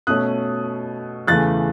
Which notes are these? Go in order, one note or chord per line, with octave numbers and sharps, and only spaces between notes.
B2 A3 C#4 D#6 F#6
E2 C#3 E3 A3 F#6 A6